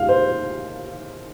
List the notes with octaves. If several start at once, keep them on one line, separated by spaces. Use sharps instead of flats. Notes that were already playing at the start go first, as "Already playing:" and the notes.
Already playing: D#2 D#3 G#3 F5
C5